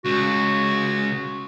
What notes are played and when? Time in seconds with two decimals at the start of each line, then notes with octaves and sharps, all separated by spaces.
0.05 C#2 F#4